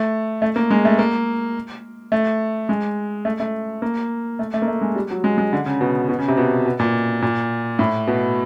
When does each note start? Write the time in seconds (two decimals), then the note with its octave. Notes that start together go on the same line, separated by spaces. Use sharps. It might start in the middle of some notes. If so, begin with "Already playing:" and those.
Already playing: A3
0.42 A3
0.56 A#3
0.71 G#3
0.85 A3
0.99 A#3
2.12 A3
2.69 G#3
3.25 A3
3.40 A3
3.82 A#3
4.39 A3
4.54 A3
4.62 A#3
4.68 A3
4.81 G#3
4.96 G3
5.11 F#3
5.24 G#3
5.38 G#3
5.53 D3
5.66 C#3
5.81 B2
6.09 B2
6.19 C#3
6.28 C3
6.37 B2
6.66 B2
6.80 A#2
7.22 A#2
7.79 A2
8.07 B2